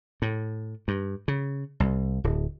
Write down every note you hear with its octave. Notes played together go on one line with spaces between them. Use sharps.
A2
G2
C#3
C2
D1